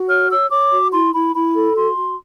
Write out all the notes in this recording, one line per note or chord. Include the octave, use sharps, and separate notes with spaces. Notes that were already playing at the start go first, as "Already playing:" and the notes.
Already playing: F#4
C#5 F6
C#5 E6
C#5 D6
F#4
E4 C6
E4 B5
E4 B5
A4
F#4 C6
F#4